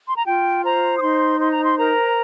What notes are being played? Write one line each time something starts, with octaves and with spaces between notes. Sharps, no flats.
C6
A#5
F4 G5
C5 A#5
D#6
D#4 C6
C5 C6
A#5
C6
A#4 A#5